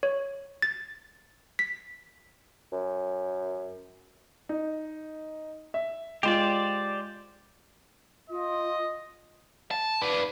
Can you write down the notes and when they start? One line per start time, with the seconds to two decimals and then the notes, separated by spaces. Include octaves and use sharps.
0.03 C#5
0.62 A6
1.59 B6
2.72 F#2
4.49 D#4
5.74 E5
6.23 G#3 F4 G4 C5 D5
8.30 F4 D#5
9.71 A5
10.02 B4 D5